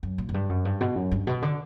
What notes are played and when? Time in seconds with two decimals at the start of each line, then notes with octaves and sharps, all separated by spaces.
0.03 F#2
0.18 A#2
0.29 F#2
0.34 G2
0.49 F#2
0.65 G2
0.81 B2
0.96 F#2
1.12 G2
1.27 B2
1.42 D3